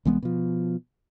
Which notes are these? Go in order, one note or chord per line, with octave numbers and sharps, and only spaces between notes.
C2 E3 G#3 B3
B2 F3